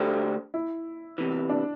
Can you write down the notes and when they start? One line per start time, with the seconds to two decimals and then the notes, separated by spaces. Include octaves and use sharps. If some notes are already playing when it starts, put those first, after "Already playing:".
Already playing: D3 A3 D4 G4 C5
0.54 E4
1.18 E2 C3 E3
1.49 D4